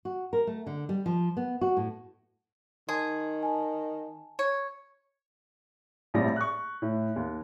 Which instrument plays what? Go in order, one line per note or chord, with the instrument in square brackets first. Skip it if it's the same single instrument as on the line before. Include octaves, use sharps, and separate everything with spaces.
[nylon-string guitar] F#4
A#4
A3
D3
G3
F3
B3
F#4
A2
[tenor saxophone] D#3 [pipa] G#4 [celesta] A5 C6
[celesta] G#5 A5
[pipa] C#5
[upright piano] A#1 A2 G3 C4 A#6
C#6 F#6
A2
D#2